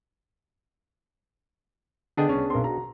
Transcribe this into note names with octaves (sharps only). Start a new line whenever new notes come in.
D3 B3 D4 G#4 D#5 G5
C2 C#4
B1 C4 A#4 C6
F#4 A#5